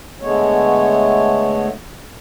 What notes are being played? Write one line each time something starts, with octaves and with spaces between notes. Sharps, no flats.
D3 G#3 A3 B3 C#5